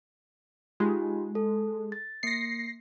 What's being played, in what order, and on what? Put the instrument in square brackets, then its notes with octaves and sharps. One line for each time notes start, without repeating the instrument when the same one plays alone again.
[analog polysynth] G#3 [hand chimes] D#4 F4 G4
[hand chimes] A4
A6
[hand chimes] A#3 C#7 [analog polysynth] A#6 C7